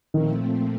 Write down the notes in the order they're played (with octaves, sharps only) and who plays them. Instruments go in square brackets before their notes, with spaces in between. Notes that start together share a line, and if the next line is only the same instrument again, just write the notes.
[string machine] A#2 F3 A3 C4 [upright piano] D#3